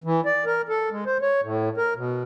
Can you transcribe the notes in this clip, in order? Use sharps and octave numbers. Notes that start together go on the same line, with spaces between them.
E3
D5
A#4
A4
G#3
C5
C#5
A2
A#4
B2